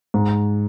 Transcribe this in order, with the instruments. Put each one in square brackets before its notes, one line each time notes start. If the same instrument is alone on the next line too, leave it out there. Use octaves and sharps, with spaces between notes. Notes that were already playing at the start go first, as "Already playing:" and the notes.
[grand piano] G#2